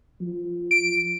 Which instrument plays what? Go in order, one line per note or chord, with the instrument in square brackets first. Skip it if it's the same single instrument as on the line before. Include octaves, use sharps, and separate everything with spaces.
[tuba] F3
[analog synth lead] D7